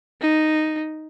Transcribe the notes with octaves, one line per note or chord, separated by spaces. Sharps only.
D#4